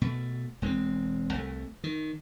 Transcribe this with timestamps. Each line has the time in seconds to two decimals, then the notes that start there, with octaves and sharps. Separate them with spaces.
0.01 B2 A3
0.62 E1 G#3 B3 C4
1.34 C2 A3
1.84 D#3